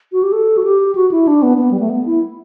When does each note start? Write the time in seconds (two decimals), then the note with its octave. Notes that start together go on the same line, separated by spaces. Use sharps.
0.12 F#4
0.23 G4
0.32 A4
0.57 F#4
0.63 G4
0.95 F#4
1.11 E4
1.27 D4
1.42 B3
1.58 B3
1.71 G3
1.80 A3
1.90 B3
2.06 E4